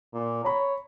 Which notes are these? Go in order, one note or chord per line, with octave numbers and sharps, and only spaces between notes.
A#2
C#5 A#5 B5